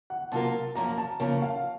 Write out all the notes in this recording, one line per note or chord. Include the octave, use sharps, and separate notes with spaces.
F#5
C3 F#3 A#3 F4 A#4 A5
F#2 F3 A#3 A#5
A5
F2 C#3 F3 A#3 A5
F5